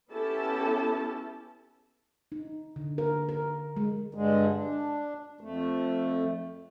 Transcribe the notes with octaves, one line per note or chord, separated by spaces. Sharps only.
B3 C#4 E4 G4 A4 A5
D#4
D3
A#4
A#4
G#3
G2 D3 G#3
D4
F2 A3